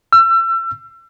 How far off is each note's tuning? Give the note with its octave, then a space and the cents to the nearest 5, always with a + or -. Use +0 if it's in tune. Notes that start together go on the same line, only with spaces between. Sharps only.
E6 +35